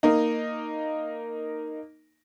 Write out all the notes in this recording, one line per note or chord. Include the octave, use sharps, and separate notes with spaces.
A#3 D#4